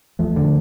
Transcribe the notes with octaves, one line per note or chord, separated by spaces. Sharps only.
E2 F3 A3
D3